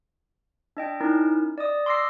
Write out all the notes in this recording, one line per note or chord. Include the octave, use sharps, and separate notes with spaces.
D4 D#5 G5
C#4 D#4 E4 A#4
D5 D#5 D#6
C6 D6 E6 A#6 C7